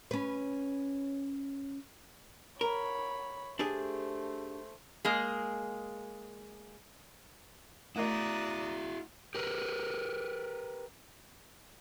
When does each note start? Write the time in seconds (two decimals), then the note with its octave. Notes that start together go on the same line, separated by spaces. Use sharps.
0.11 C#4 B4
2.61 A#4 C#5 B5
3.59 A3 D4 G4 G#4 C5
5.05 G#3 A#3 G#4
7.96 A3 E4 F#4 A#4 D5 D#5 A#5 D#6
9.35 G4 A#4 B4